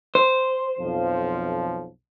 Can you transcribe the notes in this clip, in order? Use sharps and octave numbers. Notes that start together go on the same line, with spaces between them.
C5
B1 F2 F3